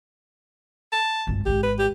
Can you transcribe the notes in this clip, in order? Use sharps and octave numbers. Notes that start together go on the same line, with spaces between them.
A5
G1 C#2
G#1 G#2 G4
B4
G4